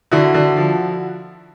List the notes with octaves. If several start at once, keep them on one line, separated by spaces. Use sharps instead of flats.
D3 E4 F#4
D3
F3